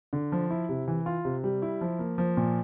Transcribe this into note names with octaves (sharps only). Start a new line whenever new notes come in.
D3
F3
E4
C3
E3
F4
C3
G3
E4
F3
A#3
F3
A#2